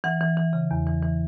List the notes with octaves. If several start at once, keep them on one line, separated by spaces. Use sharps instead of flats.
E3 F#5
E3
E3
C#3
E2
E3
E3